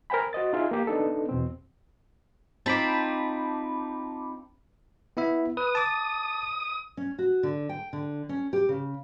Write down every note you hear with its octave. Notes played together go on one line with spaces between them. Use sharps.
A#4 C5 G5 G#5 B5
F#4 C5 D#5 A6
D#4 F4 G#4 E5
A#3 G4
B3 D4 D#4 A4
E2 B2 C4
C4 D#4 F4 A5 B5 D6
B3 E4 E5
B4 D#6
A5 D6
C#4
F#4
D3
G5
D3
C#4
G4
C#3